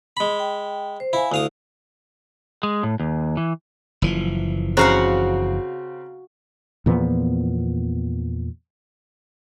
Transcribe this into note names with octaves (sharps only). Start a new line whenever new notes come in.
G#3 B5
G5
C5
E4 F5 G#5
D2 E4 F5 D#6
G#3
A2
D#2
E3
F#1 E3 F3
C#3 C4 F#4 F5 F#5 A#5
E2 A#2 F3 B3